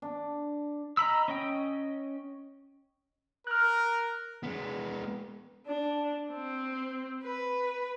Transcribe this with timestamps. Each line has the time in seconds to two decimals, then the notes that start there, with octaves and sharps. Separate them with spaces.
0.02 D4
0.97 D#5 A#5 B5 E6
1.28 C#4 D#5 G5
3.47 A#4 F6 F#6
4.43 G#3 B3
5.67 D4
6.32 C4
7.23 B4